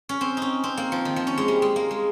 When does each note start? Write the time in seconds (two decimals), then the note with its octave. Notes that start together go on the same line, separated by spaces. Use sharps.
0.09 C#4
0.21 C4
0.37 C#4 D#4
0.64 C4
0.77 A#3
0.92 F3
1.05 D#3
1.16 F3
1.27 C#4
1.37 G#3
1.48 G3
1.62 G#3
1.76 A#3
1.91 G#3